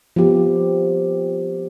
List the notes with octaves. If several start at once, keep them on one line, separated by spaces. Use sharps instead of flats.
F3 B3 G4